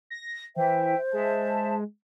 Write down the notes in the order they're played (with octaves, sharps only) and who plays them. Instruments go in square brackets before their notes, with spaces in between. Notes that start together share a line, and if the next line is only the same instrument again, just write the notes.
[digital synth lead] A#6
[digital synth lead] E3 [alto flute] C5 [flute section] E5 G5
[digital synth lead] G#3 [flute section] E5 A5